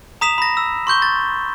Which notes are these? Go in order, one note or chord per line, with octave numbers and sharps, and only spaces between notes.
A#5 D#6 B6 E7 F7
B5 A#6
E6
C6 C#6 G6 G7
A6